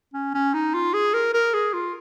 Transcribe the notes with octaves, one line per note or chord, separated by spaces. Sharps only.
C#4
C#4
D#4
F4
G#4
A#4
A#4
G#4
F4